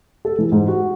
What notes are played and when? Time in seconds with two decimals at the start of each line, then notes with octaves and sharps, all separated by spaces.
0.25 A4
0.38 E3
0.52 G#2
0.68 F#4